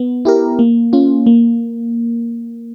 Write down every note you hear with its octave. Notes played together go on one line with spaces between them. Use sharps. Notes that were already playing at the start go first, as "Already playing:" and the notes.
Already playing: B3
E4 G4 A#4
A#3
C#4 F4
A#3